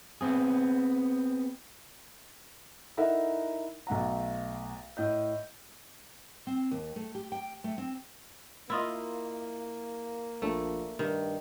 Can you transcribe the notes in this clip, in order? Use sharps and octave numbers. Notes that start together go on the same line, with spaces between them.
B3 C4 G#4
D#4 E4 A4 A#4 E5 F#5
B1 A3 F#5 A#5
A2 D#5 G6
C4
D#2
A3
G4
G5
A3
C4
A#3 E4 F4 D#5
A#1 A3
G2 D#3